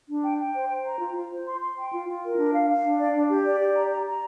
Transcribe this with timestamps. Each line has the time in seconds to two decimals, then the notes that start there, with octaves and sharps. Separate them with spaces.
0.08 D4
0.23 G5
0.38 G5
0.54 C5
0.69 C5
0.85 A#5
1.00 F4
1.15 F4
1.30 C5
1.45 C6
1.61 C6
1.76 G5
1.92 F4
2.07 F4
2.23 A#4
2.37 D4
2.53 F5
2.69 F5
2.84 D4
2.98 D5
3.14 D4
3.29 G4
3.45 D5
3.59 G4
3.75 A#5
3.90 A#5
4.06 A#5